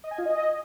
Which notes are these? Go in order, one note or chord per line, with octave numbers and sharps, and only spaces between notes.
D#5
G#5
F4
D#5